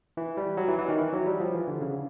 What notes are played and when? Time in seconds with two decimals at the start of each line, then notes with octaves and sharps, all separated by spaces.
0.17 E3
0.37 G3
0.57 F#3
0.68 E3
0.79 E3
0.88 D#3
0.99 E3
1.13 F#3
1.26 G3
1.40 F3
1.54 E3
1.68 D3
1.81 C#3